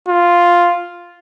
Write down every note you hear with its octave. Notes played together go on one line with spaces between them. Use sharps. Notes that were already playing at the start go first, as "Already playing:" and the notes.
F4